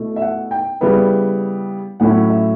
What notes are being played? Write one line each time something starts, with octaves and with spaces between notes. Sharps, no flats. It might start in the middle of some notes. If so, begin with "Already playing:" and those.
Already playing: B2 A3 E4
E5
F#5
G5
C#3 G3 B3 E4
A2 F#3 C#4 E4 F#5
E5